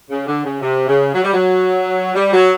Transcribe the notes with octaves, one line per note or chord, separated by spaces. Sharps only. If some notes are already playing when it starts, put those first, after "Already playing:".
C#3
D3
C#3
C3
C#3
F#3
G3
F#3
G3
F#3